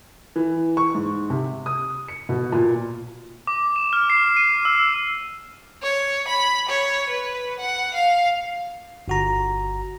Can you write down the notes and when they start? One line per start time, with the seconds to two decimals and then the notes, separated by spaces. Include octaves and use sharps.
0.36 E3
0.77 C#6
0.95 G#2
1.30 C3
1.66 D#6
2.08 C#7
2.29 B2
2.52 A#2
3.47 D6
3.76 E7
3.93 F6
4.10 C7
4.37 D#7
4.65 E6
5.82 C#5
6.28 B5
6.69 C#5
7.10 B4
7.59 F#5
7.94 F5
9.08 G1 F#4 A#5